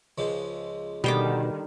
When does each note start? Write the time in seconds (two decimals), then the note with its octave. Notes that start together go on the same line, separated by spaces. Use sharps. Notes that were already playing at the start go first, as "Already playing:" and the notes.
0.18 C#2 F3 G#3
1.04 B2 D3 D#3 G3 G5 D6